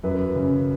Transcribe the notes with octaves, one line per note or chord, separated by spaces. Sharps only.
F#2 B4
C#3